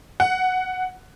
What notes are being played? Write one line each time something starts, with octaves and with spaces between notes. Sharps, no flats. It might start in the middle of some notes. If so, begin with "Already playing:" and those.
F#5